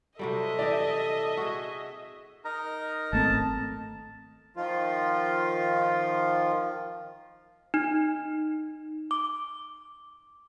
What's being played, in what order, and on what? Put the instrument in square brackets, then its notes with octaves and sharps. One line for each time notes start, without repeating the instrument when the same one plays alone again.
[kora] C3 F#3 G3 [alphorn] A4 [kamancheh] D#5 E5
[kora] E3 G4 [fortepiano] D5
[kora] F#4 G#4
[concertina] D#4 A#4 A#5
[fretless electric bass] G#1 A3 C4 [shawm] A5
[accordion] D#3 F3 F4
[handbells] D#4
D6